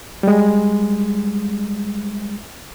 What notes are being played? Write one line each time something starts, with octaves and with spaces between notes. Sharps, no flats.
G3 G#3